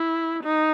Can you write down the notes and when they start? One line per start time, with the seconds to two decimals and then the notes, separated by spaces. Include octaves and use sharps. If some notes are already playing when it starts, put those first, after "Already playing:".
Already playing: E4
0.43 D#4